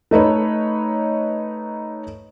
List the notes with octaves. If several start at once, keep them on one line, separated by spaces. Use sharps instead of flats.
A3 D#4 B4 C#5